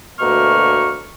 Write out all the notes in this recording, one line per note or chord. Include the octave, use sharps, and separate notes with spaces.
D2 B2 A3 A#3 C#6 F6